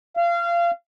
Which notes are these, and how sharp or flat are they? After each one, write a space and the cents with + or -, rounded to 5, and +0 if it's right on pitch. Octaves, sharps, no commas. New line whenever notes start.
F5 -25